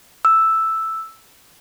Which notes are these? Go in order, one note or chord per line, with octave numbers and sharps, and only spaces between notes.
E6